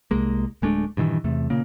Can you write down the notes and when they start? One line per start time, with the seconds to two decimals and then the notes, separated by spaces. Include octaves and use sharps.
0.11 C2 G#3 A#3
0.62 D1 G#3 A3 D4
0.97 G2 A#2 D#3 E3
1.24 E2 C3 A3
1.50 A#2 C#3 A#3